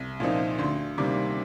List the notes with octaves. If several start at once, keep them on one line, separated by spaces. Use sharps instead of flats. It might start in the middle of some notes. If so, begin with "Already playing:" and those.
Already playing: C2
A#2 F3 C4 D#4
D2 C6
C3 D#3 G3 A#3 D6